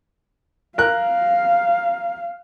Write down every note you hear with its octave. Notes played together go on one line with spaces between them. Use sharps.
A#4 F5 F#6